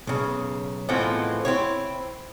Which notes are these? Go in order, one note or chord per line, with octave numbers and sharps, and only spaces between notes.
B1 C#3
A2 E3 F3 G#3 B3 C4
C4 E4 C#5